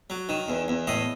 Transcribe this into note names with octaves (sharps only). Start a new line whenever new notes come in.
F#3
D#3
E2
E2
A2 D#5